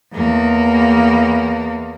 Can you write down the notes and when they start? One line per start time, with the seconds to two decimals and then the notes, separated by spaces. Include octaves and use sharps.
0.13 E2 A#3